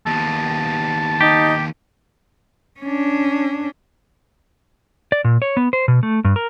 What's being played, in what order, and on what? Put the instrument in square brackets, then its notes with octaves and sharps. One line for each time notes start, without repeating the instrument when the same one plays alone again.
[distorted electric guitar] D#2 B3 [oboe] A5
[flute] D#4 [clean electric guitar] G4
[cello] C#4 D4
[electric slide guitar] D5
A#2
C#5
B3
C5
B2
A3
G2
A#4